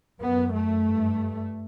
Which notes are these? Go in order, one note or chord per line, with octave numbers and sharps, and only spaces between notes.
F#2 B3
A3
G2